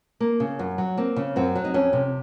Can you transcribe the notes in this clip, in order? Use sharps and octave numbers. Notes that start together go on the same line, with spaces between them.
A#3
C#3
F#2
F#3
A#3 C4
C#3
F#2 C4
F#3
D#4
F2 C#4
C3